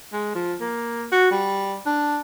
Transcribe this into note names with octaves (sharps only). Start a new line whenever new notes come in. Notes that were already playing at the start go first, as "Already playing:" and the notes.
G#3
F3
A#3
F#4
G3
D4